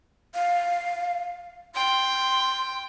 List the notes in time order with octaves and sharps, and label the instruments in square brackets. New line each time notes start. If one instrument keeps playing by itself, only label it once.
[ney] F5
[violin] G5 [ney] C6